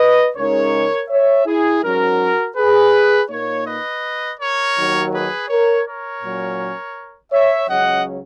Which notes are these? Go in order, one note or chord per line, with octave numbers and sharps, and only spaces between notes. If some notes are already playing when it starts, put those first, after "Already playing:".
Already playing: B4 D#5
C#2 C#3 G#3 D#4 A#4 C#5
C#5 E5
E4 G#4
G#2 F#3 C#4 F#4 A#4
G#4 B4
A#2 A#3 D#4 A#4 C#5
B4 D#5
A#4 C#5
D#2 D#3 F#3
G#4 B4
A#4 C#5
A#4 C#5
A#2 F#3 C#4
C#5 E5
C#2 C#3 F#3 C#4 D#5 F#5